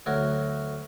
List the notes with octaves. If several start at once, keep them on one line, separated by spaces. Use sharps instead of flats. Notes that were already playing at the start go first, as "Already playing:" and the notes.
D2 F#3 A#4